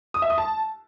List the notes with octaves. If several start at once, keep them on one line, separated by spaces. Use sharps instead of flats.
D#6
E5
D#6
A5